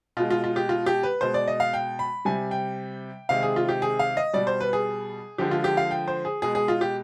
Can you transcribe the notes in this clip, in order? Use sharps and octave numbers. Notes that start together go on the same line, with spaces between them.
B2 G#3 F4
F4
F4
G4
F4
G4
B4
B2 G#3 C5
D5
D#5
F5
G5
B5
C3 G3 G#5
G5
C3 D#3 G#3 F5
G#4
F4
G4
G#4
F5
D#5
B2 G3 D5
C5
B4
G#4
D3 F3 G#3 G4
F4
G4
F5
G5
C5
G#4
B2 G#3 G#4
G#4
F4
G4